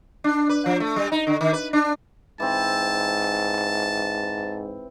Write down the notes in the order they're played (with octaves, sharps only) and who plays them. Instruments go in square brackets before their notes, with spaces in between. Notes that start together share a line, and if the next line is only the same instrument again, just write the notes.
[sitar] D4
B4
F3
A3
G3
D#4
D3
D#3
B4
D4
[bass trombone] G#2 [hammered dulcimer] E3 C4 [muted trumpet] A5